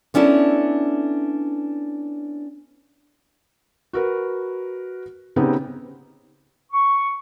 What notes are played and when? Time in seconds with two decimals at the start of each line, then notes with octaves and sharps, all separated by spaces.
0.14 B3 C#4 D4 E4 A4
3.93 F#4 A#4 B4
5.36 C#3 B3 C4 D#4 G4
6.72 C#6